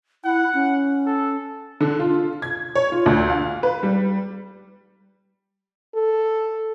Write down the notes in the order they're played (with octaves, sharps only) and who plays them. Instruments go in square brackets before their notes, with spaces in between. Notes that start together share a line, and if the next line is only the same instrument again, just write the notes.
[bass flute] E4 [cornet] F#5
[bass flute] C#4
[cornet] A4
[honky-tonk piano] D3
F4
G#6
C#5
F4
D2
F5
B4
G3
[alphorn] A4